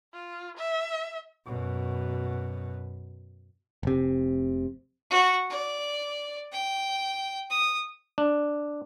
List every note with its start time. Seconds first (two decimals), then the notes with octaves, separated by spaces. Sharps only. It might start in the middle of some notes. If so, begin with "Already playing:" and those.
0.14 F4
0.57 E5
1.46 F#2 B2
3.83 F1 C3
5.10 F#4
5.50 D5
6.52 G5
7.50 D#6
8.18 D4